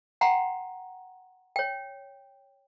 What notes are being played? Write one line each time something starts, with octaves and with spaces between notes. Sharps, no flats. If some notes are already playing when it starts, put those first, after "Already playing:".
F#5 G5 A#5 C6
C#5 G5